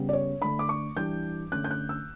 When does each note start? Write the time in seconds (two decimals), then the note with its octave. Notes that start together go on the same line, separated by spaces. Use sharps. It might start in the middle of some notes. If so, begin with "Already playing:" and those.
Already playing: C#3 G3 B3
0.09 D5
0.13 C#5
0.41 D3 A3 D4 B5
0.59 D6
0.69 C#6
0.97 E3 G3 D4 G6
1.52 D3 A3 C#4 F#6
1.64 G6
1.71 F#6
1.89 E6